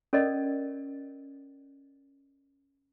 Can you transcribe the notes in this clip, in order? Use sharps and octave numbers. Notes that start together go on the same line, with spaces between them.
C#4 A4 A#4 D5 D#5